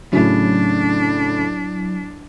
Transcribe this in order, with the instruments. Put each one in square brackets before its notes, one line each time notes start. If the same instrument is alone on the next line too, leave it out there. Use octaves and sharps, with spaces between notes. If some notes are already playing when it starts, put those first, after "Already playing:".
[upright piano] A2 C#3 [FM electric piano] F#3 E4 [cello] D4